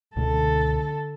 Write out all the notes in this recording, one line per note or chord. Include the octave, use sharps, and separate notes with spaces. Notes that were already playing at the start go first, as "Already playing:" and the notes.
C#2 B2 D3 A3 A4